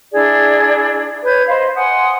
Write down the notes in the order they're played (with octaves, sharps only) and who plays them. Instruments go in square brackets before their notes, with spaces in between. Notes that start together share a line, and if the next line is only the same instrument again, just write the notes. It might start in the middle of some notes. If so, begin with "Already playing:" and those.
[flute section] D4 E4 G#4 D5
B4 C#5 G6 G#6
C5 D#5 F5 B5
F#5 G#5 C6 D#6